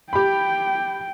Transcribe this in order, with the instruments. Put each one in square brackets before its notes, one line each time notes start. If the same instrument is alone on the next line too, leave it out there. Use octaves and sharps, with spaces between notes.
[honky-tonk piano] G4 B5 [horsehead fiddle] G5